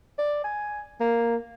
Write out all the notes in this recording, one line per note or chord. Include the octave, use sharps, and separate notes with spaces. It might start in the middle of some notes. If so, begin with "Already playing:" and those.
D5
G#5
A#3